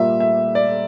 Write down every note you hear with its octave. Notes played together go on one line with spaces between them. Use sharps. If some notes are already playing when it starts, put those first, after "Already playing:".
Already playing: A#2 G3 A#3 E5
E5
D5